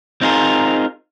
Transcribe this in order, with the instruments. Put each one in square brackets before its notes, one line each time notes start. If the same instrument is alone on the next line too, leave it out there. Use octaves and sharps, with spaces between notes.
[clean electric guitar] C4 D#4 F4 G#4 A#4